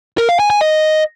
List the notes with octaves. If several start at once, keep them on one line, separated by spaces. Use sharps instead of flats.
A#4
F5
G#5
G#5
D#5